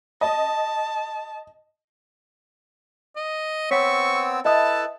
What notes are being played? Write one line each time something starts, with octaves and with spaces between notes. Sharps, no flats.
D#5 A5
D#5
B3 C4 C#5 C#6 E6 B6
E4 A4 B4 D#5 E5 A5 D#6